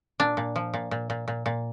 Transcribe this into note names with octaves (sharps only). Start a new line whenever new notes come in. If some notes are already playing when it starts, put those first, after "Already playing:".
A#2 D4
A#2
F3
A#2
A#2
A#2
A#2
A#2